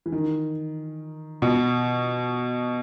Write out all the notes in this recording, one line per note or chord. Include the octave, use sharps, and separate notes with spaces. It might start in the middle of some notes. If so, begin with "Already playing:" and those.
E3
D#3
B2